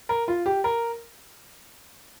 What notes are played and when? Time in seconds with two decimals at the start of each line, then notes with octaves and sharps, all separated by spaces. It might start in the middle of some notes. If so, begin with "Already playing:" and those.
0.09 A#4
0.28 F4
0.46 G4
0.64 A#4